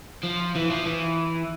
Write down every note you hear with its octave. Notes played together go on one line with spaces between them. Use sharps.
F3
E3
F3
E3